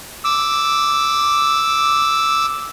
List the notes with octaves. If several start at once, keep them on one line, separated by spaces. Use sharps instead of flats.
D6 E6